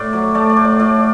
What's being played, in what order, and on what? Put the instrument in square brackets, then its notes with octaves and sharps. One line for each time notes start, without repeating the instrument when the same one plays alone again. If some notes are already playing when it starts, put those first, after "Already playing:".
Already playing: [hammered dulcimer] A2 D5
F#3
A3 D5
D5
A2
D5
A2 D5